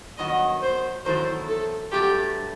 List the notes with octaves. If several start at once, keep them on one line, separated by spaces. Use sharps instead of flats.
G2 D#3 F#3 B3 F#4 D#5
C5
E2 D#3 F#3 A3 E4 C5
A4
G2 F#3 A3 G4